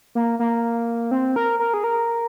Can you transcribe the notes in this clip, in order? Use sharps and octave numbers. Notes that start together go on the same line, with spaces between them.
A#3
A#3
C4
A#4
A#4
G#4
A#4